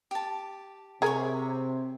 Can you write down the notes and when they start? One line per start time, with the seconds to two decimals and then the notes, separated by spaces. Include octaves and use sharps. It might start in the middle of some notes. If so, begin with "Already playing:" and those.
0.11 G4 A5
1.02 C3 G#4 A#4 C#5 B5 C#6